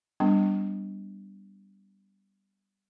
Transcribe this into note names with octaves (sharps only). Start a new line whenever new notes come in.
G3 B3 D4